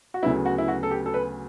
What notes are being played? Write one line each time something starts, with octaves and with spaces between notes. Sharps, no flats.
F#4
D2 C#3 F#3 B3 E4
F#4
E4
F#4
A4
G4
A4
B4